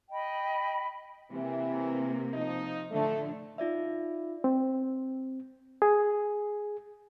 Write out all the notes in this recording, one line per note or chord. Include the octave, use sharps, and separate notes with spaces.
D#5 G5 B5
C3 E3 A#3
F3 D#4
A2 D3 F3 A3
D#4 F4 D5 E5
C4
G#4